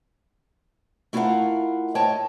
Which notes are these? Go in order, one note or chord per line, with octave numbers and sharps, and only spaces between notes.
A3 E4 F4 A#4 F5 F#5
A2 C#5 D#5 G5 A5